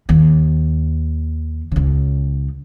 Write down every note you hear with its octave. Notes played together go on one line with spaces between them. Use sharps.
D#2
C#2 C#3